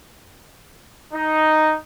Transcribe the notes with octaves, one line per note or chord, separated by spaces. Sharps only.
D#4